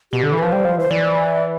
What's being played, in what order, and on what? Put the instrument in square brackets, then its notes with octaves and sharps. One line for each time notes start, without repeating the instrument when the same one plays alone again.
[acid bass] B2 [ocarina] G4
[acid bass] D3 [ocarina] A4
[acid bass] E3
[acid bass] F3 [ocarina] B4
[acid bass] G3 [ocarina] C5
[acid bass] F3
[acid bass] E3 [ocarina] C5
[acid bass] E3 [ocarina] D5